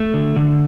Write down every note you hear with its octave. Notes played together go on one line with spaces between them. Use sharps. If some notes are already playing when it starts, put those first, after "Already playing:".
Already playing: A3
D3
D3